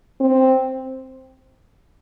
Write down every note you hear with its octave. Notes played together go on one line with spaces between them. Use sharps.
C4